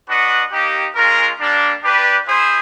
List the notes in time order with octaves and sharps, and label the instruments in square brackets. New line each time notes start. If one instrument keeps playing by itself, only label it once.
[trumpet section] D4 F#4 B4 D#5 F#5
A#3 D#4 G4
G#3 C#4 F4 A#4
G3 A#3 D4
D4 G4 B4 D5
E4 G#4 C5